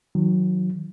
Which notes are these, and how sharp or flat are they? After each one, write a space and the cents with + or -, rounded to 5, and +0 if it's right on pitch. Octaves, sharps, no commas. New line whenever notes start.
D#3 +20 F#3 -15